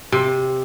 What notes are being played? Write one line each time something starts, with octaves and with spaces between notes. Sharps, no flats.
C3